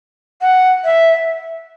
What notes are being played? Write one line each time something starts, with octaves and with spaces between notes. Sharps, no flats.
F#5
E5